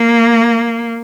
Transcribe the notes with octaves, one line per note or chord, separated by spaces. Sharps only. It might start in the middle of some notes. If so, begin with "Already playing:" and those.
Already playing: A#3